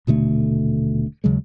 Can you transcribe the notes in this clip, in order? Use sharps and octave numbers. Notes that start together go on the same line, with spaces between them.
D#1 B2 D3 A3
D#2 C#3 F#3 G#3